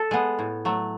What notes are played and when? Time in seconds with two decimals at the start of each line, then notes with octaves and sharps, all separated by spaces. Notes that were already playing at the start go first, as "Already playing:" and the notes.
Already playing: A4
0.11 G#3 B3
0.39 A2
0.65 F#3 A3